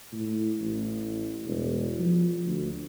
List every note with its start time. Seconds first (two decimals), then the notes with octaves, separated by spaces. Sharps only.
0.12 A2
0.60 A1
1.45 E1
1.99 F3
2.45 D2